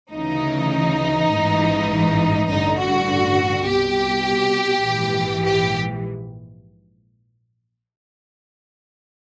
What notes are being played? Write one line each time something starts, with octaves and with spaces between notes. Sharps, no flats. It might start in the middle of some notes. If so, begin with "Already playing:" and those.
D2 C#3 E3 D#4
A1 G#2 E3
A1 G2 D3 D#4
F#4
C2 B2 G4
A#1 G#2 E3
G4